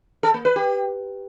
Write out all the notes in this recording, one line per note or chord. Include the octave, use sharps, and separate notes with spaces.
A4
A#3
B4
G4